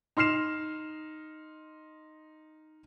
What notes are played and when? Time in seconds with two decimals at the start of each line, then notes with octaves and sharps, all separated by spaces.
0.17 D#4 C6 F6 C7 E7